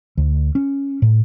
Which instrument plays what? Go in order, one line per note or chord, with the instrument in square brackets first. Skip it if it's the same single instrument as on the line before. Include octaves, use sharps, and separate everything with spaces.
[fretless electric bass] D2
C#4
A2